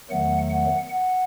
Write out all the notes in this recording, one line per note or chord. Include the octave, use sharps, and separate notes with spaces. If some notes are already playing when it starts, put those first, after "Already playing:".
E2 D#3 F#3 A3 F#5
F#5
F#5